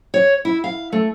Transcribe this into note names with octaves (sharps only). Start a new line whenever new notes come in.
C#5
E4
F5
A3